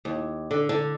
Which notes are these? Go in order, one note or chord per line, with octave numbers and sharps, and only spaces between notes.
D#2
D3
D3